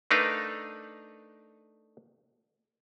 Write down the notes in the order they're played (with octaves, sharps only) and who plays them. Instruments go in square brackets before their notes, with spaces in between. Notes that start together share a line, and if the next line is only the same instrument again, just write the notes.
[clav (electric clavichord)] A3 D4 D#4 A#4 B4 F5